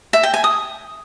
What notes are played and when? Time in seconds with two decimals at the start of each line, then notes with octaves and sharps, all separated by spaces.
0.13 E5
0.23 G5
0.34 G#5
0.44 D#6